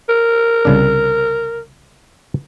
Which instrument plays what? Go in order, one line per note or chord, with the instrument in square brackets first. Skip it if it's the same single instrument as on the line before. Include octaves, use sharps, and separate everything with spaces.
[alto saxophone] A#4
[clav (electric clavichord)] C2 C#3 D4